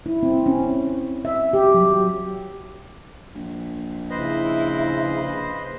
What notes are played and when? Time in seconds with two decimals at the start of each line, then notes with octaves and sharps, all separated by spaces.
0.06 E4
0.23 C4
0.46 C#4
1.25 E5
1.53 G4
1.74 F#3
3.35 A#1
4.10 C#3 E4 B4 C5 D#5